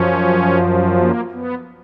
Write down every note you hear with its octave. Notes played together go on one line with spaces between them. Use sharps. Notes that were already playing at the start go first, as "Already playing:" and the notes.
Already playing: F#2 F3 C#4
A#3
B3